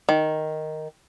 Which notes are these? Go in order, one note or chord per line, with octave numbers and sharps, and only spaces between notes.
D#3